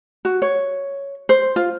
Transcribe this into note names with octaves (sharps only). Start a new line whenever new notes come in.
F#4
C#5
C5
F4